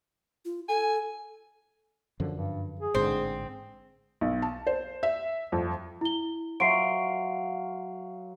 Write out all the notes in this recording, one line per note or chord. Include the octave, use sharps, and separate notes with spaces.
F4
A4 G#5
F#2 D3 F3
G2
G#4
A1 G#2 D3 C4
B1
A5
C5
E5
F2
E4 G7
F#3 E5 F5 C6 C7 D7